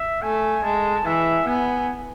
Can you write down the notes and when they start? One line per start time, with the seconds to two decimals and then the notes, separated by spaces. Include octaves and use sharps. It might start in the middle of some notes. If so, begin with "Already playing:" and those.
Already playing: E5
0.22 A3 G#5
0.63 G#3 A5
1.05 E3 E5
1.46 B3 G#5